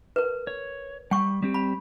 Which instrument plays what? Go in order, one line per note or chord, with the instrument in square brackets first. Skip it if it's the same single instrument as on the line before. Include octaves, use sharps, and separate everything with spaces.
[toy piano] A#4 B4
[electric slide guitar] C#5
[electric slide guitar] G3 [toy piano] G5 C#6
[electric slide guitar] G3 C4 G4
[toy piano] B5